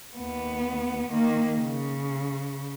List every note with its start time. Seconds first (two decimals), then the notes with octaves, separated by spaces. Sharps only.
0.17 D#2 B3
1.12 D#3 A#3
1.58 C#3